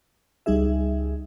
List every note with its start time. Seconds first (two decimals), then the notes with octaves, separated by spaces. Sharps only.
0.46 C#2 G3 D#4 G#4 E5